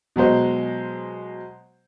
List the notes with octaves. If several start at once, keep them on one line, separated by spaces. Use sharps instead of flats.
B2 F#3 G#3 C5